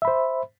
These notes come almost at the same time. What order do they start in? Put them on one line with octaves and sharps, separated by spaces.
E5 B5 C5